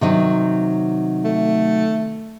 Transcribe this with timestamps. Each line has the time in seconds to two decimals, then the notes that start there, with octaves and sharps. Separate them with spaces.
0.01 C3 D#3 F#3
1.25 A3